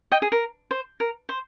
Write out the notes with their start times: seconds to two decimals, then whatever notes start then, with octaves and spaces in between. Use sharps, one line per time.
0.12 D#5 G5
0.22 G#4
0.32 A#4
0.71 C5
1.00 A#4
1.29 C5